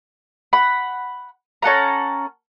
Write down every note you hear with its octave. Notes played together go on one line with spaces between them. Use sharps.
F#5 B5
C#4 A4 F#5 A#5